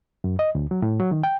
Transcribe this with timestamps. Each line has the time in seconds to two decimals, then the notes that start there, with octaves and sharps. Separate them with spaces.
0.24 F#2
0.39 D#5
0.55 D2
0.71 F#3
0.82 A2
1.00 F#3
1.11 D#3
1.23 G5